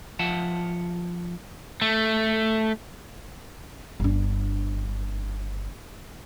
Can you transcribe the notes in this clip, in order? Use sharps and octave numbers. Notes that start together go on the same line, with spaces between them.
F3 E5 F#5 A5
A3
G1 D4